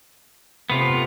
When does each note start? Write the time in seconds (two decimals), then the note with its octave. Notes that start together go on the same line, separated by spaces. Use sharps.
0.70 C3 A3 B3 F4